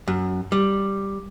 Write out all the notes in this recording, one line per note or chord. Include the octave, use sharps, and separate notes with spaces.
F#2
G3